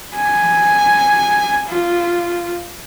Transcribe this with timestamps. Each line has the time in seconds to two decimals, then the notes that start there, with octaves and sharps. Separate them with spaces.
0.15 G#5
1.68 F4